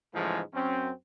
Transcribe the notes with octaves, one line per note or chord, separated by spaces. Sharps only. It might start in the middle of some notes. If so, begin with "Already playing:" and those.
G#2 C#3 E3 F3 G#3 A3
F#2 C4 C#4